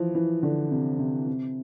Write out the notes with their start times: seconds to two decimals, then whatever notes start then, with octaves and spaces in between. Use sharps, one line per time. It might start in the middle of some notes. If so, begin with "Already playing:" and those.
Already playing: E3 F3
0.15 E3
0.43 D3
0.71 C3
0.99 C3
1.27 C3